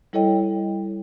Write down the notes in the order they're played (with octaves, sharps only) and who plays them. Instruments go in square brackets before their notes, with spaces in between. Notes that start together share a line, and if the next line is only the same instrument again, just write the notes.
[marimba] G3 E4 A4 C#5 D#5 G5